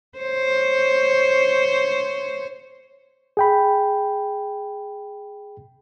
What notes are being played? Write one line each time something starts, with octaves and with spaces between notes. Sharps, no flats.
C5 C#5
G#4 G5 B5